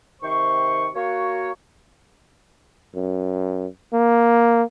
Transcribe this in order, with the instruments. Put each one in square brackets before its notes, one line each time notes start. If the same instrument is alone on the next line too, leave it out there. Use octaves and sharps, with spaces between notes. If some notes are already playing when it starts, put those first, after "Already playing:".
[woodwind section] C3 D#3 C5 C#6
A#3 F#4 C#5
[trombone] F#2
A#3